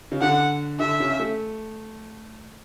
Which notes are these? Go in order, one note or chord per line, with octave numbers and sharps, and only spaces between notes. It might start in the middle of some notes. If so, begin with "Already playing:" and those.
C#3
D3 F#5
D3 E5
C#3
A3